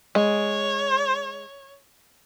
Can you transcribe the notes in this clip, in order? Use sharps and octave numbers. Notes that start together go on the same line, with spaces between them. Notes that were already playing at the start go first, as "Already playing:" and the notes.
G#3 C#5